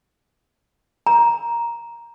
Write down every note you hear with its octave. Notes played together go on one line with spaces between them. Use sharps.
A#5